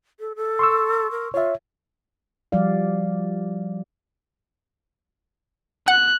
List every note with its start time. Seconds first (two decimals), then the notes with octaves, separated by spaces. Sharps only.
0.20 A4
0.36 A4
0.59 C6 C#6 E6
1.11 A#4
1.34 F4 C#5 E5
2.52 F3 G3 F#4 D5 F5
5.88 F#5 F#6